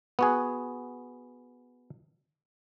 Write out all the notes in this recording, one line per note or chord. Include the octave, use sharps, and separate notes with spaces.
B3 F#4 G#4